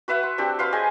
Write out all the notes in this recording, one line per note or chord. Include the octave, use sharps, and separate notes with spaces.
F#4 B4 E5 F#5
C6
C4 D4 F#4 G4
B4 F5 C6
G#4 C5 D#5 G#5